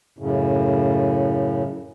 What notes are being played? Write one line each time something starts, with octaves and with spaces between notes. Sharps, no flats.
F#2 A2 C#3